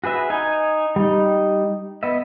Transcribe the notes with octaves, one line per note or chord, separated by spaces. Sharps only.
F#4 G#4 B4 E5
D#4 G#5
G3 D#4
B3 D#5 E5